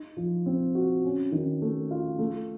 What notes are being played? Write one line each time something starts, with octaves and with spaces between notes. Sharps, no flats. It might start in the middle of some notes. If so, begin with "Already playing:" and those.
Already playing: D#4
F3
C4
F#4
C#4
D#3
A3
F4
A3